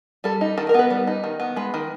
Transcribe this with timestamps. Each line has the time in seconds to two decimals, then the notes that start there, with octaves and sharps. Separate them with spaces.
0.24 G3 A4
0.41 D#4
0.57 D#3 A4
0.69 A#4
0.74 B3 B4
0.90 G3
1.07 D#4
1.24 D#3
1.40 B3
1.56 G#3 B4
1.74 D#3